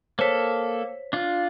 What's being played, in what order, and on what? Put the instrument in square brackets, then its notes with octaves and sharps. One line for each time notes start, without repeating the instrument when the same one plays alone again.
[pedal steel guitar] A#3 A4 [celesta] C5 C#5 B6
[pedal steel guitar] D4 F4